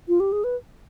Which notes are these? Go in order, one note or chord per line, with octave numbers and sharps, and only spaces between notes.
F4
G4
G#4
B4